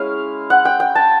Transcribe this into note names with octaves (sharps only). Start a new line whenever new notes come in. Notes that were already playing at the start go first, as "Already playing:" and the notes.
Already playing: G#3 C#4 E4 F5
F#5
G5
G5
A5